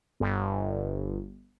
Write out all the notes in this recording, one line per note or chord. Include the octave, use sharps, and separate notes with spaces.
G1